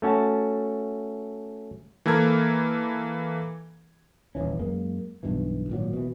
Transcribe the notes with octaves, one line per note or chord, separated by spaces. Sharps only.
A3 C#4 F#4 A5
E3 A#3 A4 A#4 G#6
D#1 G#1 E3 C#4
F#2 G#3 A#3
B1 G2 B2 E3
G#1 A#2 F#3
B2 E3